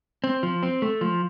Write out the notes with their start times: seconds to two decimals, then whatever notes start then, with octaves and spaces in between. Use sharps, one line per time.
0.24 C4
0.43 F3
0.63 C4
0.82 A3
1.01 F3